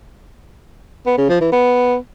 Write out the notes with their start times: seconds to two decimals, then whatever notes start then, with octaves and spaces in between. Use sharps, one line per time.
1.06 B3
1.18 C#3
1.29 F3
1.41 E3
1.52 B3